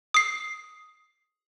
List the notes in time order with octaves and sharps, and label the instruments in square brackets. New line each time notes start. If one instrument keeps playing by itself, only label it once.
[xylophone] D#6 C7